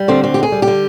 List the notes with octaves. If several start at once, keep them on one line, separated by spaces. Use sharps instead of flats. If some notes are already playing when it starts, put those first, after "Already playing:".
Already playing: G3
D3 C4
D2 C4
G4
D2 G#4
G3
G4
D3